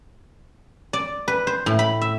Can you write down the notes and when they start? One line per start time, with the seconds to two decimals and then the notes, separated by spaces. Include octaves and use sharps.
0.93 D5
1.28 B4
1.47 C5
1.66 A2
1.79 B5
2.01 E5